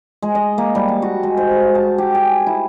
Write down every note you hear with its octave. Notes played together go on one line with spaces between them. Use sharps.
G#3
D#5
A#3
G3
A5
F#4
G#3
C5
A5
G4
G#4
E4